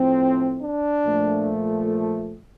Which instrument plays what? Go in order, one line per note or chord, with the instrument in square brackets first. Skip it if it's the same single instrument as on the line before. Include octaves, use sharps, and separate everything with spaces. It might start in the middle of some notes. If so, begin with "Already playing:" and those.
Already playing: [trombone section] A2 F3 A3 C4
D4
A#2 F3 A3